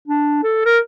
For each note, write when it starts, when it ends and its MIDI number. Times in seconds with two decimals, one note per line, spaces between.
0.08 0.39 62
0.43 0.60 69
0.65 0.78 70